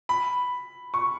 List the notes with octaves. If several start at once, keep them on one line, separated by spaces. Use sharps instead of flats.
B5
C#6